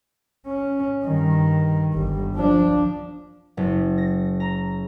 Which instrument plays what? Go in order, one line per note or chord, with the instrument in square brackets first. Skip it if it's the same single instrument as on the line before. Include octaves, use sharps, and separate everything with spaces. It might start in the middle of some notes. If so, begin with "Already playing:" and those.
[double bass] C#4
G2 D#3
G1 G3
F3 D4
[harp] F#1
A#6
A#5